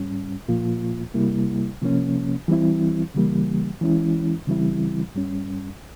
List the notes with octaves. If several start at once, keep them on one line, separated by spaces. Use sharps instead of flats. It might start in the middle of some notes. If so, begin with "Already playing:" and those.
Already playing: G#2 G3 C#4
A#2 F3 A#3 F4
C3 G3 A#3 E4
C3 F3 A#3 C#4
E3 G3 C4 E4
C#3 E3 G3 A#3
E3 G#3 C#4 E4
C#3 E3 G3 C4 E4
G2 G3 C#4